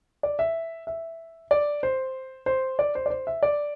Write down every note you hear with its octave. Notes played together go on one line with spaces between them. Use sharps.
D5
E5
E5
D5
C5
C5
D5
C5
D5
C5
E5
D5